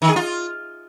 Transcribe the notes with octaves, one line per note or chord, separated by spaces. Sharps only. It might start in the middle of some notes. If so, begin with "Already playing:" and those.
D#3
G#4
F4